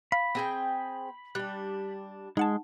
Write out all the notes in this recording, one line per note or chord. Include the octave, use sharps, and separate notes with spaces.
F5 B5
C4 G#4 G5
G3 D4 F#6
G#3 D#4 F#5 A5